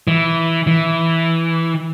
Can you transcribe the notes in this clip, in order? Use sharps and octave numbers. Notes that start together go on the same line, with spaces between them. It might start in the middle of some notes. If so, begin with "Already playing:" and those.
E3
E3